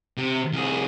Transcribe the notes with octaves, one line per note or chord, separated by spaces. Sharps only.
C3
C2 G#4